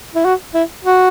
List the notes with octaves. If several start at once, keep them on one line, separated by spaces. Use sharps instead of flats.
E4
F#4
E4
F#4